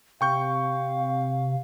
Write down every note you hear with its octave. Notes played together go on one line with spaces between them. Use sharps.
C3 F5 G5 C#6 G6